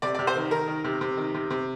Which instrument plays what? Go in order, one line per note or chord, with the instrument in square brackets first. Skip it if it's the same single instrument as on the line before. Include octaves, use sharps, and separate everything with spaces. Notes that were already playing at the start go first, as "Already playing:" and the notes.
[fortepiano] C3 D5
D5
C3
C5
D#3
D#3 A#4
D#3
C3
C3
D#3
C3
C3